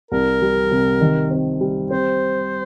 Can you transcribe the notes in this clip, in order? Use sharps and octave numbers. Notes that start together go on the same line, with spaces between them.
C2 A#4
G3
C3
D#3
C4
G3
C4 C5